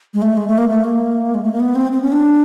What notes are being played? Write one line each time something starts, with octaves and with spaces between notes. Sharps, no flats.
G#3
A3
G#3
A3
A#3
A3
A#3
G#3
A3
A#3
B3
C4
C4
C#4
D4